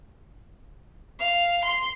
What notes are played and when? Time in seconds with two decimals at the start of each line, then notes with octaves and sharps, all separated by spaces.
1.20 F5
1.64 C6